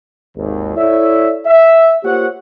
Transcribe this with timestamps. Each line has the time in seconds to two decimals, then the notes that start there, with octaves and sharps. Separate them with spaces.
0.37 G#1 D#2
0.76 E4 A4 C#5 D5 E5
1.46 E5
2.04 A#3 F4 G4 C5 C#5 F#5